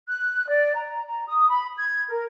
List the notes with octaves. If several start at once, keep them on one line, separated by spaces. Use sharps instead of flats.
F#6
D5
A#5
A#5
D#6
B5
G#6
A#4